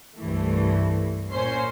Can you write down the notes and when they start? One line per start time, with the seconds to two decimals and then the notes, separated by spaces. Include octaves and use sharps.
0.16 C2 G2 E3 A3
1.31 A#2 C#4 C5 C6